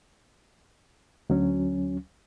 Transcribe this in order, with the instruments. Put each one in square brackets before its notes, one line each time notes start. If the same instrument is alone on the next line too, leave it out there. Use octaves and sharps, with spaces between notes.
[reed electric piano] D2 F#3 C#4